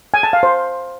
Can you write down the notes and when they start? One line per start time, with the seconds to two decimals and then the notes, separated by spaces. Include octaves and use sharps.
0.14 G#5
0.23 A5
0.33 F5
0.43 C5